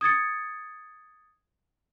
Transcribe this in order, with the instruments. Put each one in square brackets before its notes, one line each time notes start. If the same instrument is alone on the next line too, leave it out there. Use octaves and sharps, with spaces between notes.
[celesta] D#6 G#6 A6 C#7